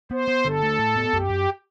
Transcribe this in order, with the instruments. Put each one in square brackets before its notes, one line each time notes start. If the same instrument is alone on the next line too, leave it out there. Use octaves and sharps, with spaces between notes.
[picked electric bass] B3 [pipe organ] C5
[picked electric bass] B3
[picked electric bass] D3 [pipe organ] A4
[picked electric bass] A3
A2
B3
[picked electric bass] F#2 [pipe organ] G4
[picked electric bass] F#2